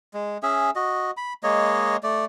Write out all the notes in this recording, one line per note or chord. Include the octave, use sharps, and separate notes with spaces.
G#3
C#4 G#4 E5
F#4 D#5
B5
G#3 A#3 C#5 D#5
A3 D5